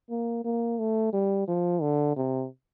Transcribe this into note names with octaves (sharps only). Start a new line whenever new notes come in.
A#3
A#3
A3
G3
F3
D3
C3